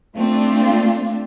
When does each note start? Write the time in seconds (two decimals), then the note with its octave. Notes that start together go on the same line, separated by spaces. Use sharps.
0.16 A3 C4 D4 F4